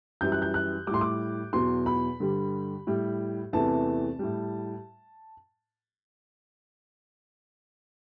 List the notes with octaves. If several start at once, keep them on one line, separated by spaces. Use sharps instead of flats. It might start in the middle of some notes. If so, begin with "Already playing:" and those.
F#2 E3 G3 G6
F#6
G6
F#6
A2 G3 C6 D6
D6
E2 B2 F#3 C6
B5
G2 D3 G3
A2 G3
E2 C3 E3 A3 A5
A2 G3